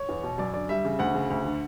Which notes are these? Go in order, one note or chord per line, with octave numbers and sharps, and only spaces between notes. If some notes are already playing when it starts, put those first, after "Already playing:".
Already playing: C#5
E2
B2
F#2 D5
D3 D5
G3 E5
C#3
D2 F#5
C#3
D2
D3